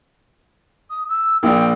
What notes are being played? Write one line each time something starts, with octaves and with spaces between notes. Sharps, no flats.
D#6
E6
A#1 G5